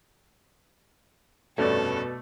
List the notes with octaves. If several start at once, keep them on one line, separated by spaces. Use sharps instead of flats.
F1 G2 B2 A3 C#4 A4 D5